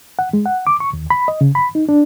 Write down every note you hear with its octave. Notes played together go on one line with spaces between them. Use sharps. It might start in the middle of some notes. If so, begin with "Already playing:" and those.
F#5
G#3
F#5
D6
C#6
D#2
B5
D#5
C#3
B5
D#4
D4